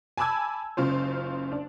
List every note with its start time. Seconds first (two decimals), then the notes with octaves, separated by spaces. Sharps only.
0.17 G#5 A5 B5 D6 E6 G#6
0.77 F#1 C#3 F4 C5
1.52 D4